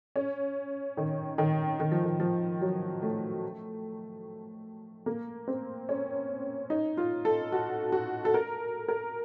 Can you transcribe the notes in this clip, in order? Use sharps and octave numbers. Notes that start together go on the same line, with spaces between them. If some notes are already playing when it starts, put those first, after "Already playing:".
C#4
D#3
D#3
D#3
F3
D#3
F3
F#3
A3
A#3
C4
C#4
D#4
F4
A4
F#4
F#4
A4
A#4
A#4